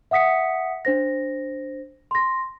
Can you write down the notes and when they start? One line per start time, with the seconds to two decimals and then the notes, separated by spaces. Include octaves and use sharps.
0.11 E5 F#5 D#6 B6 C#7
0.85 D4 C5 A#6
2.11 C6 A#6